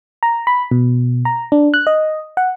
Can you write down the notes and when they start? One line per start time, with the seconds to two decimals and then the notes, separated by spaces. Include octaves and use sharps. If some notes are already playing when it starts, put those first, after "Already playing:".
0.23 A#5
0.47 B5
0.71 B2
1.25 A#5
1.52 D4
1.74 F#6
1.87 D#5
2.37 F#5